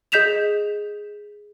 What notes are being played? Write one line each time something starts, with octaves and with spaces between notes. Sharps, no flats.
G#4 D#5 G6 B6 E7 F7